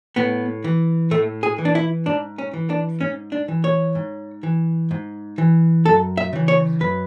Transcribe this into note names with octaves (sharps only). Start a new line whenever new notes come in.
A2 B3
E3
A2 A3
G#4
E3
D4
E4
G#2 D4
C#4
E3
D4
G#2 C#4
D4
E3
C#5
G#2
E3
G#2
E3
F#2 A4
E5
C#3 E3
C#5
F#2 B4